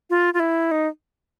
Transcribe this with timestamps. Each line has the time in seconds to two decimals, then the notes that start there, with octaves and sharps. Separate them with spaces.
0.10 F4
0.34 F4
0.40 E4
0.71 D#4